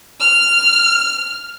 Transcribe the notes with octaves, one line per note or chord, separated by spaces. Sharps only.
F6